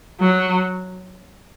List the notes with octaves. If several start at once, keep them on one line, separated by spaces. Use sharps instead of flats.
F#3